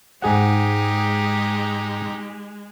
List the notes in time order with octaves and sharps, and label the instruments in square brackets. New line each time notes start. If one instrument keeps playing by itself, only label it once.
[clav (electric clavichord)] G#2 G#4 F#5 [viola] G#3 [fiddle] D#4 G4